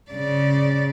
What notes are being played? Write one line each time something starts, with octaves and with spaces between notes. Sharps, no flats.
C#3 D5